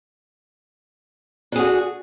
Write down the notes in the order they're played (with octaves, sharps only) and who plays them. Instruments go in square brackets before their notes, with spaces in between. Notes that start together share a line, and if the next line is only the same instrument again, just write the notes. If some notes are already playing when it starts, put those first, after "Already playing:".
[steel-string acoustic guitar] D4
G#4
F#4